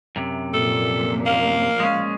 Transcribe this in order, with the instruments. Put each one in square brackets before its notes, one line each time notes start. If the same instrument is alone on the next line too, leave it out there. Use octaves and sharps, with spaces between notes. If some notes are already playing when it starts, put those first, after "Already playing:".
[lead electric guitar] F#2 C3
[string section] A#2 F3 [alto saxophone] A4
[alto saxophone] A#3 [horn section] F5
[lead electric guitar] G#3 C#4